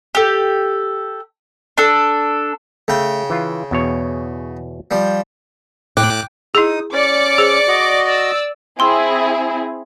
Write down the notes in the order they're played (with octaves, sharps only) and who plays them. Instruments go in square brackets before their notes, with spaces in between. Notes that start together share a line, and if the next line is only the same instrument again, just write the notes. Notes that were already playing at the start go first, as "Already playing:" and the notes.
[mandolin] G4 A4
D4 A4
[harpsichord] C#3 G5 [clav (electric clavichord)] A3
[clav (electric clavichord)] E3 F4
E2 B2 C#5
[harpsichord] F3 G3
[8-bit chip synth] A2 D6 F#6 [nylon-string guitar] G5
[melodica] D#4 D#6 [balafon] E4 G#4
[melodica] C#4 [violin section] D5 D6 C#7
[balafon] G#4 C5
[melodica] F#4 D#5
[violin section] D5 E6
[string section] C4 E4 G#4 [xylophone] G5 C6 E6